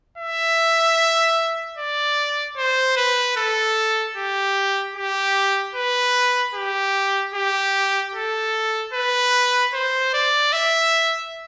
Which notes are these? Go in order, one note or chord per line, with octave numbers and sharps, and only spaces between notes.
E5
D5
C5
B4
A4
G4
G4
B4
G4
G4
A4
B4
C5
D5
E5